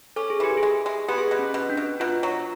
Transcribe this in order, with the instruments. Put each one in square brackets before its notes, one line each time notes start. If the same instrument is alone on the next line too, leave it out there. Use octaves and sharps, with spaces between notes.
[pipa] C#4 [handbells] A4
[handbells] G#4
[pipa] E3 [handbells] G4
[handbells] G#4
[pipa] G#3
G#3
[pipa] B3 [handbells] G4
[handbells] G#4
G4
[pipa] B2
[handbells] C#4
[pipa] B2
[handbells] D4
[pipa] B2
[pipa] B2 [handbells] F4
[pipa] F#3